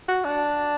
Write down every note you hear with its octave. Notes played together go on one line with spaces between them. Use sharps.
F#4
D4